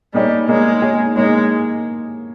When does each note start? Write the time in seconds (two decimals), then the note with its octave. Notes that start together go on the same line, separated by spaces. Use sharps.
0.14 G3 A#3 D#4 G#4 C#5
0.48 G#3 A#3 D#4 G#4 C#5
0.81 A#3 D#4 G#4 C#5
1.16 G#3 A#3 D#4 G#4 C#5